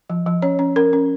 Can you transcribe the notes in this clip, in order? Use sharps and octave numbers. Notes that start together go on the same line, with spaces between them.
F3
F3
C#4 C#5
C#4
C#4 A#4
C#4